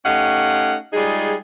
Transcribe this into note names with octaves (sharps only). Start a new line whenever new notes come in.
A3 C#4 D#4 G4 F5 F#5
G3 G#3 D#4 F4 G#4